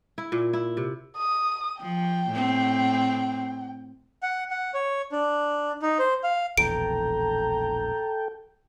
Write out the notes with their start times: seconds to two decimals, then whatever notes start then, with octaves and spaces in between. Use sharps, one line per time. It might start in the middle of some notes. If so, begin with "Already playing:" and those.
0.18 E4
0.32 A#2
0.53 E4
0.77 C3
1.17 D#6
1.81 F3 G5
2.31 A2 C4
4.23 F#5
4.51 F#5
4.74 C#5
5.12 D4
5.82 D#4
5.99 C5
6.24 F5
6.58 E1 A#1 E2 A4 G5 A#5 D7